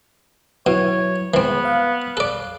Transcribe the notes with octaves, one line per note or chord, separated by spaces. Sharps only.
B2 F#3 E4 C#5
E3 G#3 B3 C4
F5 F#6
A4 D5